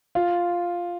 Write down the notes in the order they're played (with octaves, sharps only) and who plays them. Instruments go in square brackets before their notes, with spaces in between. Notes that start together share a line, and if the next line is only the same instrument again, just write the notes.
[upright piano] F4